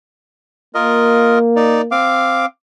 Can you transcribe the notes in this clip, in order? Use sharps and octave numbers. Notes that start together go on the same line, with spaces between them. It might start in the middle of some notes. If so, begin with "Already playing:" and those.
A#3 F4 A#4 D#5
D#4 D5
C4 F5 D6